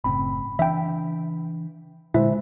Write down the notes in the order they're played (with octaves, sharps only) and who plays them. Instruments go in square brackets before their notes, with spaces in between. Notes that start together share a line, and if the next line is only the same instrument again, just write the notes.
[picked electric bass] F#1 A2 C4 [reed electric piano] C#3 B5
[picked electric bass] E3 D4 [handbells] E5 G5
[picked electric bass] A#2 D3 [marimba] G#3 [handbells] E4 [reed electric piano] C5 E5